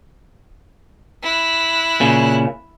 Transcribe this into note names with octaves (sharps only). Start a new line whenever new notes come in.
E4 F#6
A#2 C#3